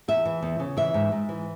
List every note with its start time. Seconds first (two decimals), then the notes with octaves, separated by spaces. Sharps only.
0.08 E2 E5
0.25 E3
0.43 E2
0.60 C#3
0.77 E3 E5
0.94 G#2
1.12 G#2
1.29 E3